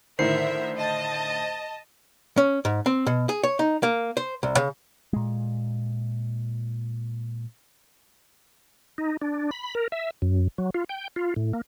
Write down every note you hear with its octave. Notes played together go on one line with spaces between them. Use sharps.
A2 D3 D#3 A#4 C5 E5 C7
D#5 A5
C#4
G#2
C4
B2
G#4
C#5
D#4
A#3
C5
C2
C#3
A#2 G#3
D#4
D4
B5
A#4
E5
F#2
F#3
F4
G5
F4
A2
A#3